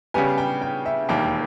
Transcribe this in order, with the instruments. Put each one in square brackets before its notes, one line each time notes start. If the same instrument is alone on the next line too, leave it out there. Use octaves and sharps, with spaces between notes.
[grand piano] C#3 G3 B3 G4 [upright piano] G#5
[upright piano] G5
G5
E5
[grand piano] E1 D#2 D#3 G3 A#3 [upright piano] G5